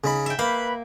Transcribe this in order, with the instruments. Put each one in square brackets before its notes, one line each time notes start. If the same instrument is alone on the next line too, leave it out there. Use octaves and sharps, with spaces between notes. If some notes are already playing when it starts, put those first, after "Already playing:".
[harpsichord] C#3 D#4 B5
[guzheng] E5 G5
[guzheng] A#3 [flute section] B4 B5 [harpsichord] F5